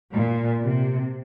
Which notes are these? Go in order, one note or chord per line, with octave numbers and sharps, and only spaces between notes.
A#2
C3